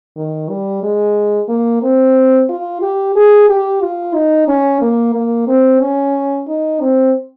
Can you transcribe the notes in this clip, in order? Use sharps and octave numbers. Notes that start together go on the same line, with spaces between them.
D#3
G3
G#3
A#3
C4
F4
G4
G#4
G4
F4
D#4
C#4
A#3
A#3
C4
C#4
D#4
C4